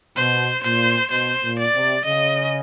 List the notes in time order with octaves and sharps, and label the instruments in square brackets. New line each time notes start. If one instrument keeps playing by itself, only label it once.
[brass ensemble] B2 [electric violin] C5
[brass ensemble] A#2 [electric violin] C5
[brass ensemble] B2 [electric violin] C5
[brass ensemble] A#2
[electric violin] D5
[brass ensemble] C3
[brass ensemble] C#3 [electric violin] D#5